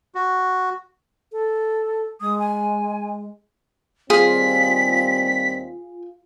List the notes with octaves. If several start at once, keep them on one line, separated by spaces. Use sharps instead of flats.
F#4
A4
G#3 D#6
G#5
D#2 G3 C4 F4 G#4 B6